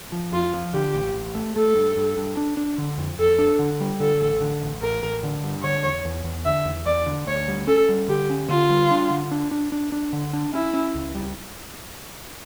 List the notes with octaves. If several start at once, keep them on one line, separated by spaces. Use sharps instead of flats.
F3
F2 F4
F3
D3 G4
A1
A1
A3
A3 A4
G2
G2
G2
D4
D4
D3
F2
F2 A4
D4
D3
G3
D3 A4
A1
D3
A1
A1 A#4
A1
D3
G2
D3 C#5
E2
E2
E2
D3 E5
E2
E2 D5
D3
D2 C#5
G3
C#4 A4
G3
D3 G4
C#4
D3 F4
G3
D4
D3
D4
D4
D4
D4
D3
D4
C#4 E4
C#4
C#2
G3